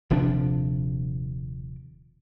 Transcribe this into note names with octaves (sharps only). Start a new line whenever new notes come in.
D#1 C3 F3 D4